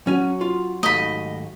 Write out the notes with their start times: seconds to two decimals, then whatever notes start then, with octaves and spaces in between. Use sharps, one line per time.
0.07 F#3 C#4 F#4 G#5
0.41 F4
0.83 D#2 G#2 A3 D#5 B5